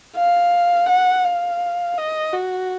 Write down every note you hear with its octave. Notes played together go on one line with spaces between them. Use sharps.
F5
F#5
F5
D#5
F#4